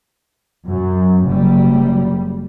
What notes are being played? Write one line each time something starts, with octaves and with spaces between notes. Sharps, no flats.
F#2
F#1 G3